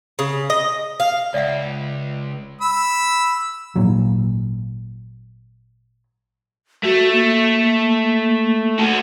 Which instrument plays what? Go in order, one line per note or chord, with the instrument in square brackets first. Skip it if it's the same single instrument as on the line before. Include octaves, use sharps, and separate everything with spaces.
[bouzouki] C#3
D#5
F5
[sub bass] D1 [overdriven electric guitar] C#2 [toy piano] D5 E5 F#5
[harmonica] B5 E6
[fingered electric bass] G#1 A#2 F#3
[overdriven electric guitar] A3 [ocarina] F#4
[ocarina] A#3
[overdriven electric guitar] F#4 A4